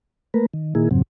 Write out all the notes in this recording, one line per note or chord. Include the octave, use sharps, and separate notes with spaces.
A3 A#3 A#4 B4
D#3
A#2 D#3 A#3 E4 G#4
F2 G#2 C#3 F#3 C4